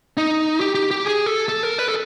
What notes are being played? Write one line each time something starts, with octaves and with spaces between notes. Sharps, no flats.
D#4
G4
G4
G4
G#4
A4
A4
A#4
B4
A4